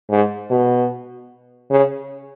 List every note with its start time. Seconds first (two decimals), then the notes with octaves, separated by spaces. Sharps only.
0.10 G#2
0.50 B2
1.70 C#3